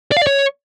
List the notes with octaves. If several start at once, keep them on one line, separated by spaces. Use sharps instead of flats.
D5
F5
D5
C#5